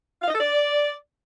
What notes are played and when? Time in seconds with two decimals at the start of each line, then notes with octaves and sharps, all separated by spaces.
0.21 F5
0.27 D#5
0.33 A4
0.39 D5